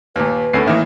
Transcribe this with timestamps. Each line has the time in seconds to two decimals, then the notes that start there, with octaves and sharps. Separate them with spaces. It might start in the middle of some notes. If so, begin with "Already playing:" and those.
0.16 D#2 A#2 B4
0.53 D2 B3 C#4 A4 C7
0.66 A2 D#3 E3 A#3 E5